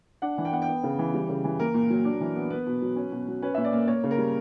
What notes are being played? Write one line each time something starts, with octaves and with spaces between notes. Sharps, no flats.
D4 F#5
E3
G5
B3 F#5
G5
B3
C#3
E3
G3
C#3
E3
A#3 A#4
A#2
F#3
D4
E3
B3
B3 B4
B2
F#3
C#4
B2
F#3
C#4 B4
A#2 E5
D5
A#3
A#3 C#5
C#3
A#4
G3